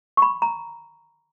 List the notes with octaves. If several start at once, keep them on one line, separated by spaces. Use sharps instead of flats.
C#6
B5
A#5